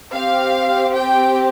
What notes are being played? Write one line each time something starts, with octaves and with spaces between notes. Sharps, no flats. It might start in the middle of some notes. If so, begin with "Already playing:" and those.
C4 G4 F5
G5